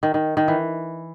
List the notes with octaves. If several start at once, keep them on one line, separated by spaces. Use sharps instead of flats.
D#3
D#3
D#3
E3